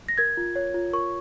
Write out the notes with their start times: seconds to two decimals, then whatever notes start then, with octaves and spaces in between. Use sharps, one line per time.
0.08 A#6
0.18 A#4 G#6
0.37 F4
0.56 C#5
0.74 F4
0.93 A#4 C#6